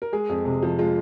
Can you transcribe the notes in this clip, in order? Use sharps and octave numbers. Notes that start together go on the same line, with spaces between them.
A#4
G#3 G#4
F2
C3
F3
G#3 F4